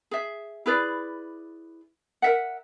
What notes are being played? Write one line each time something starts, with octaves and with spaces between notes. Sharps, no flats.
G#4 E5
E4 G#4 B4 D5
A#4 E5 F#5